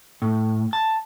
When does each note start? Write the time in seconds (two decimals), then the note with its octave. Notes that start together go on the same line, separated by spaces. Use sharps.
0.22 A2
0.73 A5